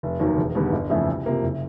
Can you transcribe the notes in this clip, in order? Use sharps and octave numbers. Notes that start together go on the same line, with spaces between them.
F1
D#2 D#3 F#3 A#3
E1
D#2 D3 G3 B3
G1
F2 C#3 E3 A3
C2
C3 F3 A#3
F#1